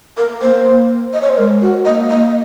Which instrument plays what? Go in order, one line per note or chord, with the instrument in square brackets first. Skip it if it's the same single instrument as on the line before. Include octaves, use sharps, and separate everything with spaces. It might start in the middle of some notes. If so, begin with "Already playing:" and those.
[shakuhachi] A#4
[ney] A#3 [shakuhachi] C5
[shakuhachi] D#5
C#5
C5
[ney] G#3 [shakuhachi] A#4
[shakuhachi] F#4
[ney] A#3 [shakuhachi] D#5
[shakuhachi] D#5